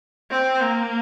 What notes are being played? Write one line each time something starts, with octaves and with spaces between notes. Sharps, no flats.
C4
A#3